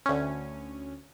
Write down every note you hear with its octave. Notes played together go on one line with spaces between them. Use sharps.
D2 C#4